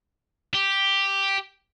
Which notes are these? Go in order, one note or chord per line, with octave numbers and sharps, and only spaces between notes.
G4